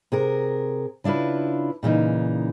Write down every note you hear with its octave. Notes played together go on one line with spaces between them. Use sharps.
C3 G#4 A#4
C#3 D4 E4 F4 B4
A#2 C#3 E3 D#4